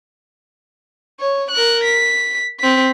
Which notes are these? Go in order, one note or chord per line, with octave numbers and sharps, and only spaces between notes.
C#5
A#4 F#6
B6
C4 B6